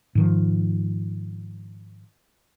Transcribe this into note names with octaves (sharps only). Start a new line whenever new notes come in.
G#2 D#3 F3